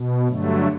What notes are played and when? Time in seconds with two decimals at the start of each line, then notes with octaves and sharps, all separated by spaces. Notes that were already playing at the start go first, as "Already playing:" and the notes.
Already playing: B2
0.28 G2 D3 F#3 A3